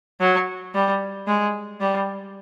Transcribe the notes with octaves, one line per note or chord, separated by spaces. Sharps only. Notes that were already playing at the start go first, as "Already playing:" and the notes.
F#3
G3
G#3
G3